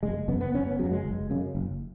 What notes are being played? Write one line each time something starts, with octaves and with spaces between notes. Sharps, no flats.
F#1 G#3
F#2 C#3 B3
B3
F#1 C#4
B3
F#2 C#3 F#3
G#3
F#1
F#2 C#3
F#1